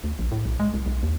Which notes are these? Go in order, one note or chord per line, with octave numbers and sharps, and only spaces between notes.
D2
A#1
A2
B1
G#3
C2
B1
D#2